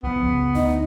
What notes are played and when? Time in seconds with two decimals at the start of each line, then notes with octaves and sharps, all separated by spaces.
0.03 C2 F3 B3
0.21 F#1 C#2
0.55 D2 D#4 D#5